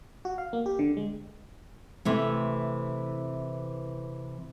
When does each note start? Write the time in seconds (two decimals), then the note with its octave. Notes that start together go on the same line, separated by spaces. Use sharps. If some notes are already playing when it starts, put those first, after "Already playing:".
0.25 F#4
0.38 F5
0.53 A#3
0.66 G4
0.79 D3
0.97 G#3
2.05 C3 E3 A3